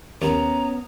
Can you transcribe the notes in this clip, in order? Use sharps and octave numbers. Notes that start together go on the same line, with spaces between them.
D#2 B3 C#4 A#5